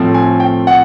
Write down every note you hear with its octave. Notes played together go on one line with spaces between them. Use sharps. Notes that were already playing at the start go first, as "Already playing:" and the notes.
Already playing: A2 F3 A3 C4
G#5
G5
F#5